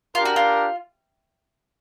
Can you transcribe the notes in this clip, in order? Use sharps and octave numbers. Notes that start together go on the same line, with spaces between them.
D4 F4 G4 A#4
F#4
F4